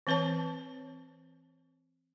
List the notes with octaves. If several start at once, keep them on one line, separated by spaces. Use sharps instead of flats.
E3 C4 B4 C#5 A5